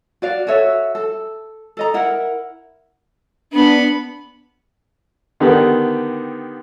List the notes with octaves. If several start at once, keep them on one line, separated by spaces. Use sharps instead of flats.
F#4 D5 F5
F#4 A4 C#5 E5
A4
A4 D#5 A#5
E4 A#4 F#5
B3 D4 B5
D3 D#3 B3 G4